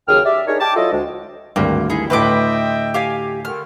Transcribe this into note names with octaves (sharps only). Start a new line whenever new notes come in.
D#2 C#3 F#3 G#4 G5 F6
G4 D5 E5
D4 D#4 G#4 A#4 C#5
G5 A5 D6
F#3 E4 F4 A4 D#5
D2 G#3
G#1 D2 G2 A#3
D#4 E4 G#4
D2 A2 B4 D#5 E5 G5 C6 D6
G4 F5 G#5
D3 D#3 F6